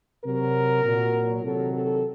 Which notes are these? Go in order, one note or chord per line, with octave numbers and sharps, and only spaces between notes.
C3 F#3 A#4
A#2 F#3
C3 D#3 F#3 A4
A4